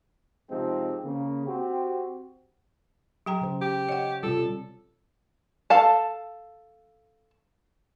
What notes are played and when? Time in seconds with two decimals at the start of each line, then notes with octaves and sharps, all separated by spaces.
0.50 C3 F3 G#3 C4 D#4 G4
1.04 C#3 A#3
1.46 C4 F#4 G4
3.26 F#3 G4 G5 A#5
3.41 C#3 C5
3.62 G4
3.89 C#5 D#5 F#5
4.23 C3 G3 F4 A4
5.70 A4 F5 A5